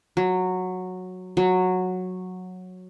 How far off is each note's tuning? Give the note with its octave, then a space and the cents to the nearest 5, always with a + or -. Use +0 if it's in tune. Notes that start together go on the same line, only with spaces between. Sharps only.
F#3 -10
F#3 -10